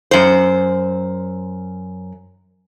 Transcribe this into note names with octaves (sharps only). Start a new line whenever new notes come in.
F#2 C5